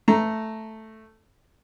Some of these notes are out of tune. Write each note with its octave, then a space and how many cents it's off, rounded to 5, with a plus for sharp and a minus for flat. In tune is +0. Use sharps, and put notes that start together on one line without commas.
A3 +0 A#5 +0